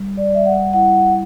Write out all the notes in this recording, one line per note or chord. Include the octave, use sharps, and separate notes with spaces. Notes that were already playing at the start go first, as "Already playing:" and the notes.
Already playing: G3
D5
G3 E5
F#5
E4 F#5